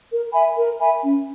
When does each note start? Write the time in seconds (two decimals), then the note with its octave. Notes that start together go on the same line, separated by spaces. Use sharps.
0.10 A#4
0.33 E5 G#5 B5
0.56 A#4
0.79 E5 G#5 B5
1.02 C#4